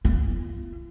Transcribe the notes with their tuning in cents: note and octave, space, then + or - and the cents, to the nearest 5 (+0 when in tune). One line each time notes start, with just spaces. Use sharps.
F4 -45